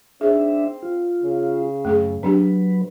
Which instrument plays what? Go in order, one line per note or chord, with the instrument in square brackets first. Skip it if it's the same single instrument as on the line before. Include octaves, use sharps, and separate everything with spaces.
[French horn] C4 [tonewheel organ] D4 E5 [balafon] D#4 G#4
[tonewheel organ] F4
[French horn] C#3
[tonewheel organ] F#2 [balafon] A3 C4 G#4
[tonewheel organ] F#3 B4 [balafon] C4 D4 G4